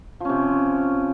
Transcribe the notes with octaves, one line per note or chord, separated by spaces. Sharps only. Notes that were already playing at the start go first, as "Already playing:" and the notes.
C3 F3 C#4